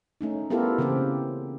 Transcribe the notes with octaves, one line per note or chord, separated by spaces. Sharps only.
A3 C#4 D#4
B3 E4 F4 G4 A4 A#4
C#3 E3 A#3 C4 G4